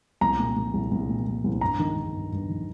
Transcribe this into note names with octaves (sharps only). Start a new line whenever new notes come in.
C2 A#5
A#2
A#2
C2
C2
A#2
A#2
C2
G2 A#5
D#3
D#3
G2
G2
D#3